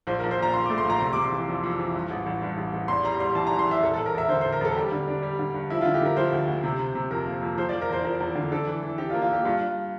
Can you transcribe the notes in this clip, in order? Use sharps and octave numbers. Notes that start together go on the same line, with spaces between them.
A#1 C5
A#4
A#1
C5
A#2 A#5
A#1 C6
D6
A3
C6
A#1 A#5
C3 C6
D6
C3
C6
E3
F2
F2
E3
G2
A1
A1
G2
A1
A1
E2 C6
G3 A#5
G3 C6
E3 A5
A#5
E3
C6
E3 E5
E1 A4
A4
E1
A#4
E1 E5
D3 C5
C5
E1
A#4
E1 A4
G3 G4
D3
D4
G3
D3
G2
F3 E4
F4
D3
G4
D3 A#4
F3 C5
D2
D2
C3
C3
C3
F2 A#4
A#3
F2
F3 C5
D5
F3
A#4
E2 C5
F3 A#4
E2
D3
D4 A4
E3
E3
D4 G4
F4
A#3
F4
A#3 G4
G2 F4
G2